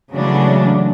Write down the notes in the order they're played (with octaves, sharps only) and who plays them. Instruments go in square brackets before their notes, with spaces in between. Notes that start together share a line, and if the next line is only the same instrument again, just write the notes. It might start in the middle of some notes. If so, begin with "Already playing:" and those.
[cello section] C#3 E3 F#3 G#3 A3 D4